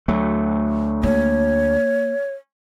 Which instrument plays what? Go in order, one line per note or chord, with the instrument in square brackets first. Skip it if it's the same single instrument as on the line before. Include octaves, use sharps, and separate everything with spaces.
[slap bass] D2 F#3 A3
[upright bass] A#3 [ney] C#5